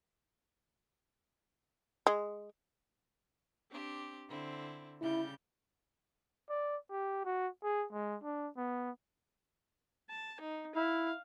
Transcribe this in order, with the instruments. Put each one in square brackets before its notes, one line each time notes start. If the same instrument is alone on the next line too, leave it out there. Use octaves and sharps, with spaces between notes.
[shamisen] G#3
[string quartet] C4 D4 G4
D3 C4 E4
[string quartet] C#3 G3 G6 [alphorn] E4
[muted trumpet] D5
G4
F#4
G#4
G#3
D4
B3
[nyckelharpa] A5
D#4
[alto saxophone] E4 [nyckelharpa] F5